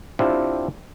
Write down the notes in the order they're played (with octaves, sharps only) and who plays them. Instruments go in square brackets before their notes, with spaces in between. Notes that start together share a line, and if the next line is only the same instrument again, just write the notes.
[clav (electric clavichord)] C4 D4 E4 F4 G4